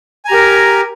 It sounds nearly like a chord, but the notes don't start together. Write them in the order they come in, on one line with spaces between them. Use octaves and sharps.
G#5 A#5 G4 A#4